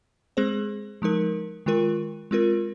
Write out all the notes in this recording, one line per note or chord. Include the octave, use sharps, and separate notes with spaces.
G#3 C4 G#4 C5
F3 G#3 D#4 A#4
D#3 G#3 F4 A#4
G#3 C4 F4 A#4